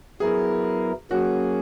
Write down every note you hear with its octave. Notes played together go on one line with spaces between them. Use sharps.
F#3 B3 E4 G#4 A#4
F#3 A#3 C#4 F#4 G#4